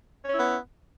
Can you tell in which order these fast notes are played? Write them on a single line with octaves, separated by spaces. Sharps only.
C#5 C#4 E4 B3